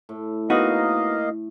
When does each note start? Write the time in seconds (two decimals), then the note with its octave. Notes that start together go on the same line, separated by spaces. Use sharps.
0.09 A2
0.50 A#3 B3 D#4 F#4 D#5 F5